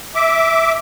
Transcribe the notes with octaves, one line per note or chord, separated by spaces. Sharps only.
E5 D6